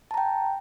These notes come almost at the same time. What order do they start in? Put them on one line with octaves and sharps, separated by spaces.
A5 A#5 G5